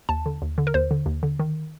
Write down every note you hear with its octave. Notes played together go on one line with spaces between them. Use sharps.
D#2 A5
D3
D#2
D3
A#4
D#2 C5
D3
D#2
D3
D#3